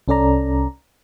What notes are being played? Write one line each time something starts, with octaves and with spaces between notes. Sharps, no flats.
C2 C#4 A4 D5 A#5